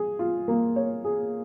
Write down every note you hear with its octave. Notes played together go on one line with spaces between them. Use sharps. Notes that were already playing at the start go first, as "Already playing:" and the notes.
Already playing: G#4
F4
A#3
C#5
G#4